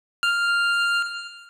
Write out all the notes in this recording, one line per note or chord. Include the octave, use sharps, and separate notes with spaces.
F6